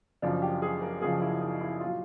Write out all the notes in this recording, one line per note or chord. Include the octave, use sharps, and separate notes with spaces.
F#1 F#2 C#3 F3 D4
G4
G#4
A#4
F#1 F#2 C#3 F3 G#4
E4
D#4
E4
A#2 F#3 F4